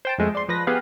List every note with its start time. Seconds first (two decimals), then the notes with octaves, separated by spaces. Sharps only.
0.05 C5 G5 A5
0.18 F2 G#3 A3
0.35 D5 C6
0.49 F3 B4 A#6
0.67 B3 G4 G#4 B4 F5 G5